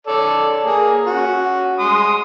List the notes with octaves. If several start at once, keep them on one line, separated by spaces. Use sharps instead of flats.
A4 C#5 D5
A#3 G#4
C#4 F#4
G#3 C6 D#6